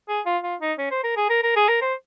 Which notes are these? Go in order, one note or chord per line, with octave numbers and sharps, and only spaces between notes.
G#4
F4
F4
D#4
C#4
C5
A#4
G#4
A#4
A#4
G#4
A#4
C5